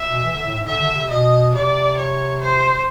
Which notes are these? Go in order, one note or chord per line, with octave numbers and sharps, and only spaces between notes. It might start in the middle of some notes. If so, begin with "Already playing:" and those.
Already playing: E5
B2
E3
D3
A2
G#2
D3 E5
D3
C3
B2 D#5
C3 D5
C#5
C5